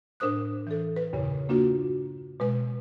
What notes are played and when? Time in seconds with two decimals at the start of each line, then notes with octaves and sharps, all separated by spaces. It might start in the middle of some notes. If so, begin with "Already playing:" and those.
0.20 A2 D4 A#4 C5 D#6 F#6
0.67 E3 A4
0.96 B4
1.13 E2 G2 A#2 C#3
1.49 A#3 D4 F4 F#4
2.40 B2 G#3 B4